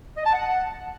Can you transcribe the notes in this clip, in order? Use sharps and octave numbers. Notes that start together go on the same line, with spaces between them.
D#5
A5
F#5